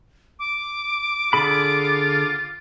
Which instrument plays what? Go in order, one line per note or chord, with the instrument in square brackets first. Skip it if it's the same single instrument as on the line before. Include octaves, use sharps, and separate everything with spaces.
[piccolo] D6
[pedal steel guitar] D3 G#4 B5 [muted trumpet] F4